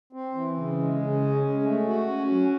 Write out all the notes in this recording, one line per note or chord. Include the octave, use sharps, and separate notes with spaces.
C4
E3
C#3
G#3
C#3
C#4
G#3
A3
F#4
C#4
F#3